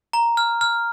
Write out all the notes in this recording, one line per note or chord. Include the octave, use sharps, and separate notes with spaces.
A#5
F6
F6